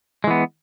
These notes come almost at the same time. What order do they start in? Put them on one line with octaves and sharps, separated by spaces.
G#3 E3 B3